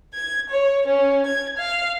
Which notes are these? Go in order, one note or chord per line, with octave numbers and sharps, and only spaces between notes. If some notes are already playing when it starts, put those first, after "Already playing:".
G#6
C#5
C#4
G#6
F5